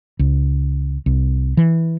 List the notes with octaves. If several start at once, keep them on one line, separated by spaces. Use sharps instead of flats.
C#2
C2
E3